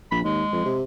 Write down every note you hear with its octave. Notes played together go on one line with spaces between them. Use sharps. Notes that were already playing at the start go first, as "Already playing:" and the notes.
A#1 B5
D#2 G#3
F2
C3